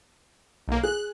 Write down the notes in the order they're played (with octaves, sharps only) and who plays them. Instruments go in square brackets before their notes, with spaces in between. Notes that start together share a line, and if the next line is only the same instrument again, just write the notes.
[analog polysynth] B1 A#3
[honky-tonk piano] G#4 [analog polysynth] F#6